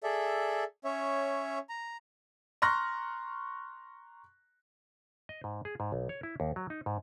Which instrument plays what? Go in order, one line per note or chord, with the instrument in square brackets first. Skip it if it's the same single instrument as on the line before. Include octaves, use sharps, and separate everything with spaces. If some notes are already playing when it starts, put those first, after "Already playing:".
[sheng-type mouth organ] G#4 A4 D5 E5
C#4 C#5 E5
A#5
[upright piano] A#5 C6 C#6 F6 F#6 A#6
[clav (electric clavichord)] D#5
G#2
G#4
G#2
B1
C#5
E4
D#2
F#3
D#4
G#2